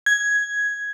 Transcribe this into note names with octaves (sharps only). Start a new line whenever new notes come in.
G#6